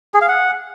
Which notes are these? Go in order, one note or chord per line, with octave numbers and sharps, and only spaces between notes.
G#4
F5
F#5